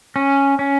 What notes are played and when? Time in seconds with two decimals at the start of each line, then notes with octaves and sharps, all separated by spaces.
0.16 C#4
0.59 C#4